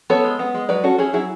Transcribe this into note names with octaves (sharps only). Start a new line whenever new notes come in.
B3 A4 C#5
G#3
B3
G#3
F#3 B4 D5
C#4 F#4 A4
C#4 E4 G#4
F#3 E4 G#4